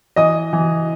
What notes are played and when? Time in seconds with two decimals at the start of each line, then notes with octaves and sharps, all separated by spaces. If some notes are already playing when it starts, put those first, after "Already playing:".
0.16 E3 D#5 D#6
0.53 E3